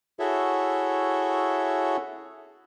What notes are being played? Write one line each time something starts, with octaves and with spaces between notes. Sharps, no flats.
E4 F#4 G#4 A4 C#5 E5